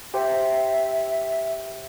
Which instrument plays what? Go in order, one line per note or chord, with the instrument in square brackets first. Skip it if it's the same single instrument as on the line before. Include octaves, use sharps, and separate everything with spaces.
[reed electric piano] G4 C5 G5 [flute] E5